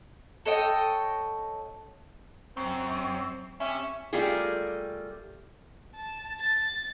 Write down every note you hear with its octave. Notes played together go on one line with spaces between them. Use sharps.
A4 C#5 D#5 G5
F#2 C4
C3 G3 C#4 E5
G3 A3 A#3 F4 G4 G#4
A5
A6